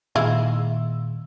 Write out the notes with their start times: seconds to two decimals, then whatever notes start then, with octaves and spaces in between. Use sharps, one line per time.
0.16 A#2 D#3 G#3 E4 F4 E6